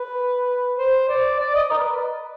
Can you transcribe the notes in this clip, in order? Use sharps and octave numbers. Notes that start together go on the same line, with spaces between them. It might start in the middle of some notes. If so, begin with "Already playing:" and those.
Already playing: B4
C5
D5
D5
D#5
A#4
B4